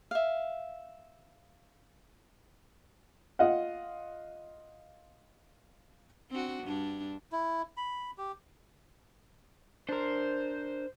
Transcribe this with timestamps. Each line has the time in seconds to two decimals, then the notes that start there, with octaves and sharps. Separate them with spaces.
0.11 E5 F5
3.39 F4 D#5 F5 F#5
6.31 C4 D4 F#4
6.63 G2 D4
7.32 E4
7.77 B5
8.18 G4
9.89 D4 A#4 C5